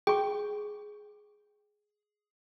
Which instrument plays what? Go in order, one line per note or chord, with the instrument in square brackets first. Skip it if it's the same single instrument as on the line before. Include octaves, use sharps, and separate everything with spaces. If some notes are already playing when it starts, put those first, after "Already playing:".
[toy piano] G#4 C#6 [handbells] G5